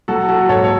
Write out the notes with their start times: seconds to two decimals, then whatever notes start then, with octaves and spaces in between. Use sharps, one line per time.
0.08 F#3 F#4 A4
0.29 F#4 A4
0.49 G#2 A4 C#5
0.64 C#5